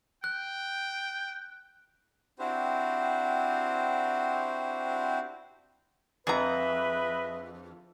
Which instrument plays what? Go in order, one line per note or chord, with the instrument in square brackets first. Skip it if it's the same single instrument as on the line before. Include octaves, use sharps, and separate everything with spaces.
[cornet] G5 [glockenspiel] F#6
[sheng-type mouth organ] C4 D4 E4 F#4 G4 C5
[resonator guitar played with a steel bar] F2 [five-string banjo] G#4 A#5 [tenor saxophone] B4 [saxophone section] D#5 E5